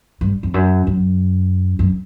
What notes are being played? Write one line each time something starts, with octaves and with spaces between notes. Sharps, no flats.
G2
F2
F#2
F#2
F#2